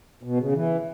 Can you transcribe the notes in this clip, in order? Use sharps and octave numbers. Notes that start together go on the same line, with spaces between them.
B2
C#3
E3